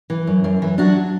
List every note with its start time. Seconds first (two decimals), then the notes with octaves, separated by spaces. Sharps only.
0.10 E3
0.27 F#2
0.44 F#2
0.62 E3
0.78 F#3 D4 F#4